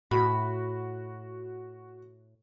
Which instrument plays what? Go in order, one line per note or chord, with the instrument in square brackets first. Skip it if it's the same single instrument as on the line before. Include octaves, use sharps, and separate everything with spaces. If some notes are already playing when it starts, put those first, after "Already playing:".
[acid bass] A2 [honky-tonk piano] F#4 [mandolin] B5